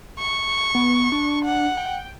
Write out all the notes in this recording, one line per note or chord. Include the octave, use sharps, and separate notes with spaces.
C#6
B3
D4
F#5
G5